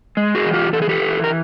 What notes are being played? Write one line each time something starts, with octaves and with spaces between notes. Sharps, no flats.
G#3
F#4 G#4
E3
F4 G4
E3 A4
G#4
G4 A4
E3
A#4